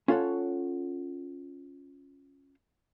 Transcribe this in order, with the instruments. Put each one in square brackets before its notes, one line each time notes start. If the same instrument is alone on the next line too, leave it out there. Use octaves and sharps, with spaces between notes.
[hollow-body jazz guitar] C#4 F4 A4 C#5 F#5